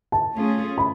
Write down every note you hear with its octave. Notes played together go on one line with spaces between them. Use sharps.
A5
A3 C#4 F4 G#4
B5